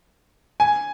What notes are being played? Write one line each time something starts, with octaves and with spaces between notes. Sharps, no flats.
G#5